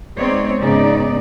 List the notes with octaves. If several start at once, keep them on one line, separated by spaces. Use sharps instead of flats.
G#3 B3 C4 D#4 C#5 D5
G#2 C#3 B3 D#4 D5